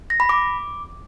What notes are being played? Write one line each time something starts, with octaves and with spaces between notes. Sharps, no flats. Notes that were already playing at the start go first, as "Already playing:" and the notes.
A#6
B5
D6